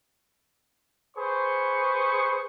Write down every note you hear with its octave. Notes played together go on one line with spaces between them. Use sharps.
G#4 B4 C5 C#6